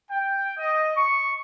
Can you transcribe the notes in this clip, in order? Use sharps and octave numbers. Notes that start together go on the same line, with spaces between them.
G5
D#5
C#6